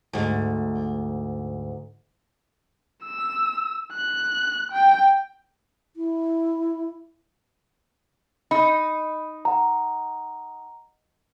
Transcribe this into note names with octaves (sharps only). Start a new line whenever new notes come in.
D2 G#2
E6
F#6
G5
E4
D#4 B5
F#5 A#5